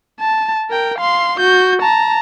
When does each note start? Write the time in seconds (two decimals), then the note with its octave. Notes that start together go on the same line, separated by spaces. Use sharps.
0.21 A5
0.70 A#4 G5
0.99 F5 C6
1.39 F#4 G6
1.82 A5 A#5